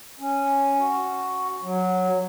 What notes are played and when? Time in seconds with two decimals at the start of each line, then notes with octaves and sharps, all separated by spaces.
0.19 C#4
0.78 F#4
1.62 F#3